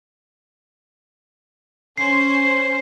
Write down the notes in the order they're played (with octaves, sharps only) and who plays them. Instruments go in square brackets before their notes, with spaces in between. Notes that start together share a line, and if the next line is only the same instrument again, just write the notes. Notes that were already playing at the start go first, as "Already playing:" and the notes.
[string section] C#4 C5 [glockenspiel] C7